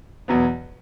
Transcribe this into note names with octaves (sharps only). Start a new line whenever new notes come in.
E2 B2 F#3 B3